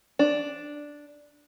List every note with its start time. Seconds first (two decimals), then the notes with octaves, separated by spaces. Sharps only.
0.19 D4